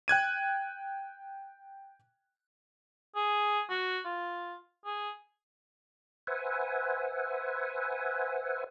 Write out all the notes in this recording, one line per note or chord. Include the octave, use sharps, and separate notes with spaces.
G5 F#6 G#6 D#7
G#4
F#4
F4
G#4
B4 C5 E5 F#5 G#5